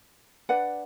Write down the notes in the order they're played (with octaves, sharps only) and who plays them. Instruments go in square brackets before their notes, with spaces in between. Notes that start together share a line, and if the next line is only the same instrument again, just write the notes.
[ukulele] D4 B4 D5 F#5